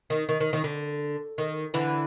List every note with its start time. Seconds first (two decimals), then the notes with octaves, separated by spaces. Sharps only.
0.10 D#3
0.29 D#3
0.40 D#3
0.53 D#3
0.64 D3
1.38 D#3
1.74 D3 E3